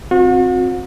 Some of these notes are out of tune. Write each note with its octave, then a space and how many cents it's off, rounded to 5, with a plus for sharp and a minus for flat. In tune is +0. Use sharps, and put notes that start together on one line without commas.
C4 +10 F#4 -40